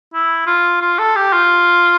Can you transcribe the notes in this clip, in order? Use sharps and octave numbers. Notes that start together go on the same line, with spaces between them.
E4
F4
F4
A4
G4
F4